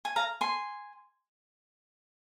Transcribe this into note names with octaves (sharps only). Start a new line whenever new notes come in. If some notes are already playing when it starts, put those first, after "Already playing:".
G#5
F5 A#5
G#5 C6